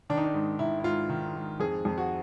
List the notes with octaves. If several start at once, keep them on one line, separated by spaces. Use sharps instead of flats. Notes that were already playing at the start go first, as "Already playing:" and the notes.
D#3 D4
D#4
D4
G#2
D#3 E4
E4
G#2 F4
D#3
G#2
F2 G#4
F2
F#4